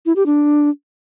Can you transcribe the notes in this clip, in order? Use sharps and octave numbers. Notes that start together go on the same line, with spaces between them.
E4
G4
D4